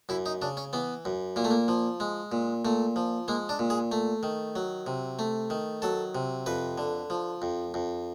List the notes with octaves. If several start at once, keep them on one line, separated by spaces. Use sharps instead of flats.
F#2 E4
D#4
C#3 D4
C#4
E3 B3
F#2
A#2 A#3
A3
A#3
F3
G#3
A#2
A#2 A3
F3
G#3 A#3
D4
A#2
G#4
A3
D#3
F#3
C3
A3
D#3
F#3 A4
C3
F2 B4
D3
F3
F2
F2